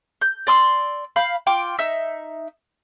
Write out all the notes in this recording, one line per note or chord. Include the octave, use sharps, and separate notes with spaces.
G6
D5 C6 D#6 E6
F5 B5 G6
F4 G5 D6
D#4 E5 E6